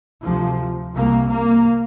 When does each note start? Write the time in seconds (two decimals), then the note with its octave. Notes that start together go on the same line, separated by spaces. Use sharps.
0.23 D2 C3 F3
0.95 C2 C3 A#3
1.31 A#3